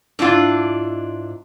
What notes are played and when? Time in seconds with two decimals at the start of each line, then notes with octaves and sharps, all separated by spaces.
0.19 G#2 D4 E4 F4